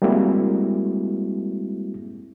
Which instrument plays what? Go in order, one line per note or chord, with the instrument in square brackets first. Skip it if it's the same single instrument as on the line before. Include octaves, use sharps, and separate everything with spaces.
[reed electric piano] G3 G#3 A#3 C4 E4 F#4